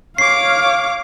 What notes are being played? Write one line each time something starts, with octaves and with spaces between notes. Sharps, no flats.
C#5 F5 D6 C7